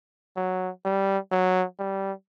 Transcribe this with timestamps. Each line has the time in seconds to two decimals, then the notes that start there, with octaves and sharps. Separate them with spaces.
0.36 F#3
0.85 G3
1.31 F#3
1.79 G3